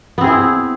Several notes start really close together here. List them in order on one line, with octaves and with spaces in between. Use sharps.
B3 C4 G#4 E4